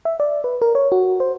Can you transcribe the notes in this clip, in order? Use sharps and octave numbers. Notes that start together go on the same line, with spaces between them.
E5
D5
B4
A#4
C#5
F#4
C5